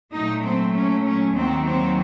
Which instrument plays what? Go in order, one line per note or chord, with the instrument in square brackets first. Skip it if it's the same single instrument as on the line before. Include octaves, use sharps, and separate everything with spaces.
[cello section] A#2 F#3 A3 D#4
C4
C#4
C#4
D#2 D#3 F#3 A#3 C4
C4